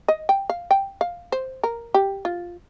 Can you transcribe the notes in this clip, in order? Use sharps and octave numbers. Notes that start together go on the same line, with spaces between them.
D#5
G5
F5
G5
F5
C5
A#4
G4
F4